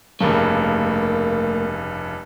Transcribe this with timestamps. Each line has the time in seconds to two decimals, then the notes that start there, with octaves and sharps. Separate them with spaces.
0.21 F1 G2 C#3 A3 A#3 A#4